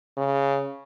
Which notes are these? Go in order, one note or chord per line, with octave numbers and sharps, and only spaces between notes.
C#3